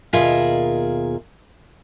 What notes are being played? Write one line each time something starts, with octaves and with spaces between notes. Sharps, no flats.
D#2 B2 F4 G#4 A#4 E5